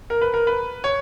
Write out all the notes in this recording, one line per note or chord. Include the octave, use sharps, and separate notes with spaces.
A#4
B4
A#4
B4
C#5